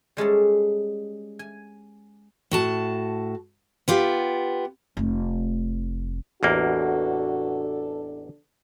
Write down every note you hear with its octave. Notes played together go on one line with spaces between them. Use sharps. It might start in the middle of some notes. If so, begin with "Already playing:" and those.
G3 G#3 C#4 A4
G#5
A2 F#4 A5
B3 F4 G4
F1 A3
A1 E2 A#3 D4 F#4 A4